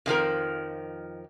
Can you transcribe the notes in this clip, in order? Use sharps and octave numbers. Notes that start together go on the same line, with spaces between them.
F2 D#3 F3 A#4